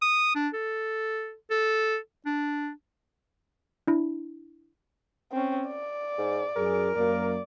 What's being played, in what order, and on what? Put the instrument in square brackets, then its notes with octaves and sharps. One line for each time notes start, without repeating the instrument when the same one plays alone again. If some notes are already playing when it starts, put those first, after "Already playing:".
[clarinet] D#6
D4
A4
A4
D4
[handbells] D4 E4
[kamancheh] C4 C#4
D5
[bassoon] G#2
[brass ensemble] F#2 G#4 [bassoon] A#4
[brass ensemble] F#2 A#3 [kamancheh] D5